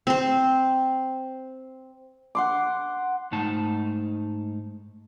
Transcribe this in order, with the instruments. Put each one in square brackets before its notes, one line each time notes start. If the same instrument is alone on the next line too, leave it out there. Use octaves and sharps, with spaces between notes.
[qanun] C4 C5
[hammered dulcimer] F#5 C6 D6
[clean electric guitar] G#2 A3 D#4 A5